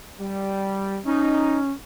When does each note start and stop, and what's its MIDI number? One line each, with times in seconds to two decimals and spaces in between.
0.20 0.99 55
1.06 1.73 61
1.06 1.58 63